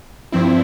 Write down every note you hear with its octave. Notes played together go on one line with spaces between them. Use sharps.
G2 F3 C4 E4